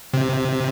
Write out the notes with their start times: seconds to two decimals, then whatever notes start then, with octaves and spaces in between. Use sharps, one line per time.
0.13 C3